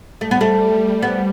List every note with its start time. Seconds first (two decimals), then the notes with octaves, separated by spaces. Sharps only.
0.21 G3 A3
0.31 B3
0.41 A3
1.02 B3